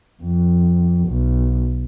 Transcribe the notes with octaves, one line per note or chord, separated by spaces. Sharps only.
F2
B1